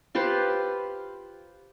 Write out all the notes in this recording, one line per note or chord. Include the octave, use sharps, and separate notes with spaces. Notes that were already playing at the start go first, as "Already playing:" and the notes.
F4 G4 B4 C5